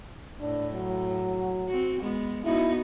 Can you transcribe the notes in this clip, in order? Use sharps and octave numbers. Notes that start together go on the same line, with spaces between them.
A2 D4
F#3
C4 F#4
G#3 B3
B3 D#4 E4 F#4